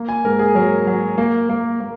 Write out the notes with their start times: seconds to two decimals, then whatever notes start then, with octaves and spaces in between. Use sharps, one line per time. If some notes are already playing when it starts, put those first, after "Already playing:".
Already playing: A#3
0.09 G#5
0.24 G#2 A#4
0.39 G#4
0.55 F#3 A#4
0.87 F#3
1.18 A#3
1.49 A#3
1.81 A#3